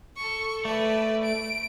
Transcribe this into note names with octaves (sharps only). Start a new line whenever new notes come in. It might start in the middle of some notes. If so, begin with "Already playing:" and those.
A4 C#6
A3 B4 D5
D7